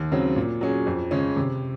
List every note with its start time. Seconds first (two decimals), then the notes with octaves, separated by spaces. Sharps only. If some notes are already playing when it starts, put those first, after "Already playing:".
Already playing: D#2
0.12 C#3 F#3 C4
0.36 A#2
0.61 F#3 C#4 G#4
0.87 F2
1.11 C#3 G#3 C#4
1.37 C3